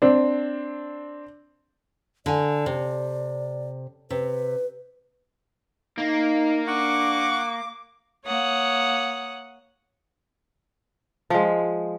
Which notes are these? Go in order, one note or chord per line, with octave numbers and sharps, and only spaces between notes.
C4 D4
D3 D5 G#5
C3
C3 B4
A#3 D#4
D4 F#5 C#6 D6
A#3 C#5 F#5 D#6
F3 G#3